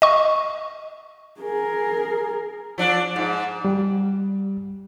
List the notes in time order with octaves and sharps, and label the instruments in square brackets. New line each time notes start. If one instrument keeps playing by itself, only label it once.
[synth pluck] D#5 C#6
[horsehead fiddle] G#4 A#4
[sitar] F3 D4
G#2
[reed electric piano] G3